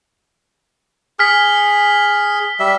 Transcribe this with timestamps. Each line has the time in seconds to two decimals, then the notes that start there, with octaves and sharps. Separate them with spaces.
1.19 G#4 F6 B6
2.60 G3 E5